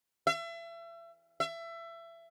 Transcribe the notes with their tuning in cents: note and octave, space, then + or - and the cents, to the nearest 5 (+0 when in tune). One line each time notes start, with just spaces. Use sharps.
E5 +35
E5 +25